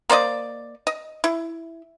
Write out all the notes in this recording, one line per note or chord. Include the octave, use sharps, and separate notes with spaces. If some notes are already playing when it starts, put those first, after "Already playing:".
A#3 C5 D5 D#5
D#5
E4